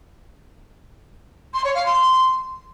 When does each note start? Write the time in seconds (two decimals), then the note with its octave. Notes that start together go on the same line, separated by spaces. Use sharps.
1.53 C6
1.64 C#5
1.75 F5
1.85 C6